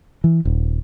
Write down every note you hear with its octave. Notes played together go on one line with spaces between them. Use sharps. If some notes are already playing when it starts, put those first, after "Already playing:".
E3
D#1